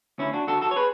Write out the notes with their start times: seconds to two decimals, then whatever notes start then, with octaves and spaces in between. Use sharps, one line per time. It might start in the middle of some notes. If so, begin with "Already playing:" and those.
0.18 D2 C#4 E4
0.34 D4 F#4
0.47 D3 F#4 A4
0.61 F#4 A4
0.71 C#5
0.76 G#4 B4